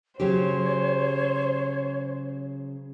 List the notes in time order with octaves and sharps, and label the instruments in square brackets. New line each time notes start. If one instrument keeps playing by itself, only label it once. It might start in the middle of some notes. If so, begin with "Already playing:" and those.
[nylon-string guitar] C#3 F#3 G4 [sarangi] C5 [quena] C#5